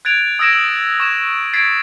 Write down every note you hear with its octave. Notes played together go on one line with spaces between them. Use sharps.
F#6 G#6 A6 D7 F7
D#6 E6 G#6 A#6 D7 E7
E6 F#7
C#6 G#6 E7
G#6 A6 B6 C7 D7